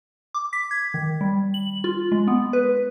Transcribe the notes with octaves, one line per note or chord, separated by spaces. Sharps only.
D6
B6
G#6
D#3
G3
F#7
F4
G#3
B3
B4